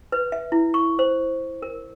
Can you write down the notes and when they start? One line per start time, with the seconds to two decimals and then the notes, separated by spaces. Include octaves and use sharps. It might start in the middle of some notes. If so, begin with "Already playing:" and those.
0.12 B4
0.32 E5
0.52 E4
0.74 C#6
0.99 C5
1.62 A#4